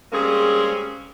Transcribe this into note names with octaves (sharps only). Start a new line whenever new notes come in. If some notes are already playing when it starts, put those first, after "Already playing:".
G3 G#3 A#3 C4 C#4 G#4